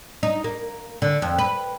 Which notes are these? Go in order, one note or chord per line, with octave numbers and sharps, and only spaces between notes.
D#4
A#3
D3
F2
B4